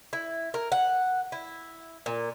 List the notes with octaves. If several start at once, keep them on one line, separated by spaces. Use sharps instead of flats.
E4
A#4
F#5
E4
A#2